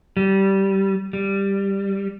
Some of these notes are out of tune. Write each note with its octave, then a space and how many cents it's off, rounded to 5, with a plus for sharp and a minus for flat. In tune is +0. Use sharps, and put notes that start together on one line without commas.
G3 -15
G3 +5